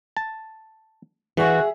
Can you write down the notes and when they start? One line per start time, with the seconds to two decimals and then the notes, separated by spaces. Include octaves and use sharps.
0.17 A5
1.37 E3 F#4 G#4 E5